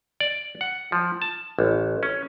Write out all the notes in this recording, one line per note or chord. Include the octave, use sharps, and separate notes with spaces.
D5
F#5
F3
A5
A1
C#4